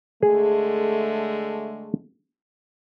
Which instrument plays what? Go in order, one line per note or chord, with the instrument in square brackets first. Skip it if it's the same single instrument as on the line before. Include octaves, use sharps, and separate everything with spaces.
[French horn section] D3 G#3 A3 [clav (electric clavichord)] G#4